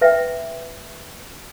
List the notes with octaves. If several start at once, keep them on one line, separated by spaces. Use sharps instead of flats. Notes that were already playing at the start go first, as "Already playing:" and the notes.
B4 E5 G5